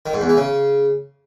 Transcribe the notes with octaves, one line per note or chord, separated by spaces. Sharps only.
D#3
G#2
E2
E3
C#3